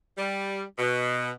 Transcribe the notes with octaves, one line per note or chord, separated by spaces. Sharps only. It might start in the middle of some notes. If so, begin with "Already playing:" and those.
G3
B2